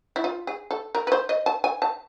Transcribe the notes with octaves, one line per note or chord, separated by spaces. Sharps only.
E4
F4
G#4
A4
A#4
B4
C5
D#5
A5
G#5
A5